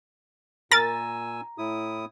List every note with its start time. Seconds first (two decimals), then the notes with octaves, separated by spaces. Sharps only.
0.72 A#2 A#4 G#5 A#5 E6 A6
1.58 A2 E4 D#6